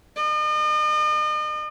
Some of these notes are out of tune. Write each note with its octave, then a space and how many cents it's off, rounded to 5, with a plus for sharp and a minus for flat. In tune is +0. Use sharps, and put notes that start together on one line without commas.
D#5 -40